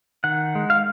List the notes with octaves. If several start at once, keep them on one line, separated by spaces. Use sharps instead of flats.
D#3 F#5
G#3
F5